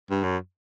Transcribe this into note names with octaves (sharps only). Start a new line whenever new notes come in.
G2
F#2